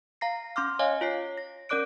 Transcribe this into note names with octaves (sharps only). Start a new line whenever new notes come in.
F5 A#5 A#6 C7
C#4 C6 D6 F6
C#5 D#5 F5 G#5
F4 C#5 C7
A#6
C#4 A#4 D5 D6 F#6 D7